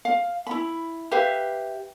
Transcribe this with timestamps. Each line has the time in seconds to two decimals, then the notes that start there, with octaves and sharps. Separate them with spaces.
0.05 F5
0.47 E4 B5
1.11 G4 B4 E5 F5